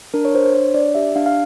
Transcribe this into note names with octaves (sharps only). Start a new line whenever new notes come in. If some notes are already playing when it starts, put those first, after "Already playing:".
D4 A#4
C#5
D4 C5
C5
D4 C#5
D4 D5
G4 E5
D4 F5
F5